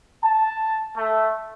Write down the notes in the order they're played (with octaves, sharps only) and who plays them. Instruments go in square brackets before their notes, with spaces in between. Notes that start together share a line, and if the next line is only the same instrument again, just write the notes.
[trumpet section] A5
A3